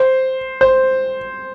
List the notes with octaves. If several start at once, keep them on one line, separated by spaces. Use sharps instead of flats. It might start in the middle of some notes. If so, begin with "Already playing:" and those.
Already playing: C5
C5